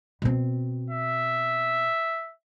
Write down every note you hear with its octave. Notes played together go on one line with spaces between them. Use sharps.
B2 C4
E5